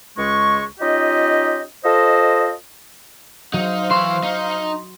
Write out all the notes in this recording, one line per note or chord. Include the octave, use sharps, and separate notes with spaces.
C#2 G#3 C#6
C#4 D#4 F4 G4 D#5
F4 A4 C5 D#5
F#3 D#4 C5 F5
E3 E5 C6 C#6
D#4